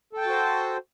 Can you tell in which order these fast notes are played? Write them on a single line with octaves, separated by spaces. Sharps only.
A4 G5 A5 F#4 C5